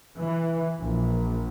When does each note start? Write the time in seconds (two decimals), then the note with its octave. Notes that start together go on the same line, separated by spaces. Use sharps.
0.19 E3
0.80 A#1